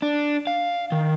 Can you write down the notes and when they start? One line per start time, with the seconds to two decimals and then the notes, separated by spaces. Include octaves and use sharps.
0.02 D4
0.47 F5
0.92 D#3